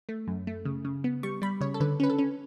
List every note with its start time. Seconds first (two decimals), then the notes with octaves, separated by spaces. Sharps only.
0.09 A3
0.28 F#2
0.47 A3
0.65 C#3
0.85 C#3
1.04 B3
1.23 G3 C#6
1.42 G3 B5
1.61 C#3 C#5
1.74 A4
1.80 D3 B4
2.00 C#4 B4
2.10 A4
2.19 C#4